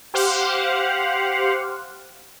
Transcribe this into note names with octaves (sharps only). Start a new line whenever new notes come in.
G4 C5 F5 F#5